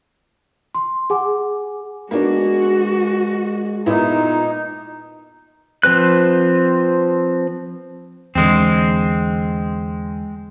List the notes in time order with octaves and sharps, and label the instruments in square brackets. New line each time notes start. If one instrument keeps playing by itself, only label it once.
[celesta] C6
G#4 F#5 G#5 D6
[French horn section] G#3 [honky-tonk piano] A#3 B3 D4 [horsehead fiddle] F#4
[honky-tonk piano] A#2 B3 E4 [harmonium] D#4
[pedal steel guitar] F3 C4 B4 F#6
[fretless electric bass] E2 D3 [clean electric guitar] G#3 C4